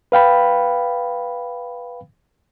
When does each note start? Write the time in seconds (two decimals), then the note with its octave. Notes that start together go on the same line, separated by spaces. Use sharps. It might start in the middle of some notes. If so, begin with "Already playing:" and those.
0.12 B4 F5 G5 B5